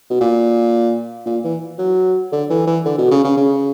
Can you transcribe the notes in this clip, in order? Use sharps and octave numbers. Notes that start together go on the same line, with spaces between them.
B2
A#2
A#2
E3
F#3
D3
E3
E3
D3
B2
C#3
C#3
C#3